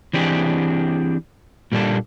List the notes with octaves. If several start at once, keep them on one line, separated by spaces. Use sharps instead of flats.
E3 C4 D4 G4 G#4
A#2 G3 A#3 D4 A4